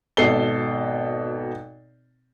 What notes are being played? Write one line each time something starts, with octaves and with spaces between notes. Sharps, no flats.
G#1 B2 A4 C7 G7